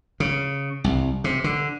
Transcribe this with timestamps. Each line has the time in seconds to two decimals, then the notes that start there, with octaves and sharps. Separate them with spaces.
0.20 C#3
0.84 C2
1.24 C3
1.44 D3